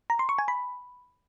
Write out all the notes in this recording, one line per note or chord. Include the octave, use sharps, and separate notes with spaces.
A#5
C6
C#6
G#5
B5